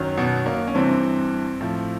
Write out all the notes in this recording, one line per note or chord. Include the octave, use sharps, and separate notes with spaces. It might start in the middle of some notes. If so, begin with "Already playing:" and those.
Already playing: F#2 D#3 F#3
B2 B3
A#3
C#4
G2 C3 E3 C4
A2 F3